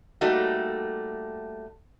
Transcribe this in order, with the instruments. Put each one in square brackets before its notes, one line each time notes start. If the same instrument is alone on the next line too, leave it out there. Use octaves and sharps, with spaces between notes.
[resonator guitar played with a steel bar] G3 A3 A#3 D#4 F#4 G4